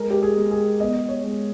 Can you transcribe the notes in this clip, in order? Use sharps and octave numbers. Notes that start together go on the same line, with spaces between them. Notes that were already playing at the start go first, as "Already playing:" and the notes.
Already playing: G#3 A#4
G4
G#4
G#3
G#4
B3 D#5
C#5
G#3